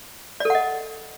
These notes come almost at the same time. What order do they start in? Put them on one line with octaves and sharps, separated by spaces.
D5 A4 F#5 D#5